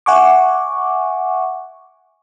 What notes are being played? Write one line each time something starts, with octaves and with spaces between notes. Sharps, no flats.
E5 F#5 G#5 C#6 D6